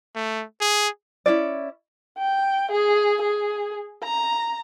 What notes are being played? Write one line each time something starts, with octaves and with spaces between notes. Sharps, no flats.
A3
G#4
C#4 E4 F4 D5
G5
G#4
G#4
A#5